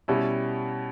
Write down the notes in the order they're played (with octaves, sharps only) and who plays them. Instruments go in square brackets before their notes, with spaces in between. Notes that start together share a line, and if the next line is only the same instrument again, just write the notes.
[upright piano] B2 G3 C#4 E4